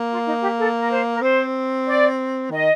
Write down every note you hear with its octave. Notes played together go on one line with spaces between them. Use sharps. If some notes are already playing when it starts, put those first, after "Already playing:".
Already playing: A#3
F4
D#4
G4
A4
A#4
C5
A#4
C4 C5
D5
D#3 D#5